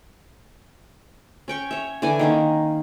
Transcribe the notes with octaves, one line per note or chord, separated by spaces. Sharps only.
C#4 G5 C#6
C#5 E5
D3 E3 D5 G#5
D#3 A#3 C#4